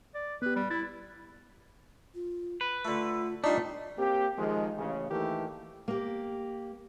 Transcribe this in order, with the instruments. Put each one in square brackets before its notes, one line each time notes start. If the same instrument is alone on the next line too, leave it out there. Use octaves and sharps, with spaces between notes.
[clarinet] D5
[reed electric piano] B3 G4 [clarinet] B4
[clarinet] G3
[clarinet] E4 [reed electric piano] A6
[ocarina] F4
[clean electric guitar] B4
[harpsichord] D3 A3 [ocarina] F4
[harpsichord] G3 C6 C#6 [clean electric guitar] A3 [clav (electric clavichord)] D4 D#4 [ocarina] F4
[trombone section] A#3 C4 G4
D#3 F3 G#3
A1 C#3
D#3 E3 A3 A#3 G4
[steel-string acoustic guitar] A#3 G4